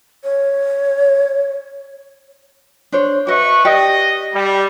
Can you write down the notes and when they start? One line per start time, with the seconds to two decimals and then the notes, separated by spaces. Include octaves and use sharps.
0.24 C#5
2.92 D4 C5 C#5
3.27 F#4 B4 D#5 E5 C#6
3.65 G4 D5 D#5 G5
4.33 G3